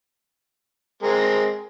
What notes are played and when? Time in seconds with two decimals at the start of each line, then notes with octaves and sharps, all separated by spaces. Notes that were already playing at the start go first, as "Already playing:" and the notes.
1.03 G#3 C4 A#4